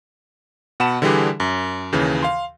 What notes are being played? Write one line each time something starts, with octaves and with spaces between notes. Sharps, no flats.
B2 F#5 A5 B5 E7
D3 E3 G3 D4 G4 G#4
F#2
D#2 C#3 E3
F5 C6